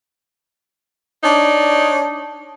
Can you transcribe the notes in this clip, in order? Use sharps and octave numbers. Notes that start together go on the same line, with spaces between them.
D4 D#4 C#5 D5